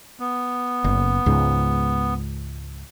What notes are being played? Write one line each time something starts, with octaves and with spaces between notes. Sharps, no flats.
B3
F#1
C#2 G#2